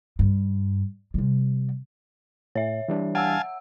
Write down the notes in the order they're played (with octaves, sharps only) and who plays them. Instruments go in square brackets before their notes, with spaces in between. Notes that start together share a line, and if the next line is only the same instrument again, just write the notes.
[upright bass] G2
C3 G3
[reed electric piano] A2 [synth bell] C#5 E5
[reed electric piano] E3 G3 D4
[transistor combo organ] F5 G#5 A5 [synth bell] F#5 E6